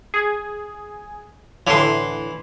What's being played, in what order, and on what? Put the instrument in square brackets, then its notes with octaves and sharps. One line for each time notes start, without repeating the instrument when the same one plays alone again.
[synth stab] G#4
[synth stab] A2 D3 [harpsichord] E3 C6